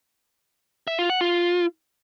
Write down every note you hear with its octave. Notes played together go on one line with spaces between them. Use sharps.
E5
F4
F#5
F4